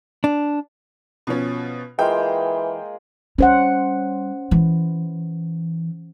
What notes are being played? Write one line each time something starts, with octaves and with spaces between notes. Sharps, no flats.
D4
B2 F3 C#4
E3 G#3 A#3 F4 G5
G3 C#4 C5 F#5
E3